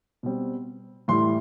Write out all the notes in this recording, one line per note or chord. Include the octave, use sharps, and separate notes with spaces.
B2 G3 C4
A2 E3 G3 C6